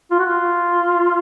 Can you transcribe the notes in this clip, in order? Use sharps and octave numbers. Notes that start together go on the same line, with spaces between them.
F4
F#4
F4